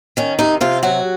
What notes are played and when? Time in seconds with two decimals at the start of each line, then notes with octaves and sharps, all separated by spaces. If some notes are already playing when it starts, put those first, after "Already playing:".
0.17 D#3 C#4
0.39 C3 D#4
0.61 C3 F4
0.83 F#3 F#4